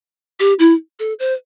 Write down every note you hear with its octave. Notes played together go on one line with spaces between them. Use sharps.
G4
E4
A4
C5